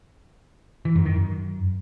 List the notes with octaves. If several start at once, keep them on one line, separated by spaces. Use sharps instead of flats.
E3
F#2
D#3
F#2